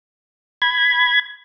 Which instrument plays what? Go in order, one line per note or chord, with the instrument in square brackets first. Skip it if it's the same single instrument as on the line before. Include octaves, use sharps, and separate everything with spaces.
[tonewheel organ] B5 G#6